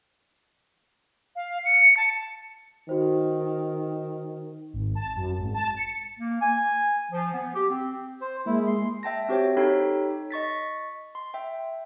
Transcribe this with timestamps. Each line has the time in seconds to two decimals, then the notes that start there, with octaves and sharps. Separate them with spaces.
1.36 F5
1.65 C#7
1.97 A5
2.89 D#3 F#4 C5
4.73 G#1
4.95 A5
5.16 F#2
5.38 G#1
5.54 A5
5.77 C#7
6.18 A#3
6.40 G#5
7.11 F3
7.34 B3
7.53 G4
7.69 C4
8.21 C5
8.46 G#3 A#3 E4
8.67 C6
9.03 E5 G5 A5 A#6
9.29 C4 F#4 G4 C5 C#5 G5
9.57 D#4 G4 A4 C#5 G5 B5
10.31 D#5 C#6 A6 B6
11.15 C6
11.34 E5 G5